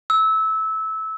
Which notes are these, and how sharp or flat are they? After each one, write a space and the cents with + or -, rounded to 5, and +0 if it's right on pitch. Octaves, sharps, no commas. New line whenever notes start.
E6 -20